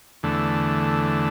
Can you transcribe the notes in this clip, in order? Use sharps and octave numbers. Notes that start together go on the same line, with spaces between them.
E2 D3 A3